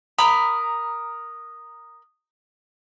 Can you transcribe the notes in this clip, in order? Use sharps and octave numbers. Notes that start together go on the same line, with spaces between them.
A#4 A#5 B5 D#6